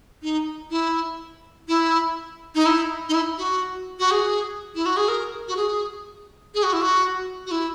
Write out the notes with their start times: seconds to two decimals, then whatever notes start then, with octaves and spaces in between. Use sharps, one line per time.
0.23 D#4
0.71 E4
1.68 E4
2.55 D#4
2.66 E4
3.09 D#4
3.14 E4
3.38 F#4
3.99 F#4
4.11 G#4
4.75 E4
4.86 F#4
4.97 G#4
5.08 A#4
5.48 F#4
5.57 G#4
6.54 G#4
6.63 F#4
6.73 E4
6.82 F#4
7.46 F#4
7.51 E4